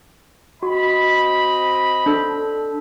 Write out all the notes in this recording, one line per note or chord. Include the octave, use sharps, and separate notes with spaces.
C4 F#4 D#5 B5
D4 A4